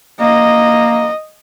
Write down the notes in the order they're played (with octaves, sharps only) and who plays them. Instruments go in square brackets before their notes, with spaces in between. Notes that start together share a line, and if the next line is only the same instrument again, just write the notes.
[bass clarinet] A#3 [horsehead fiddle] D#5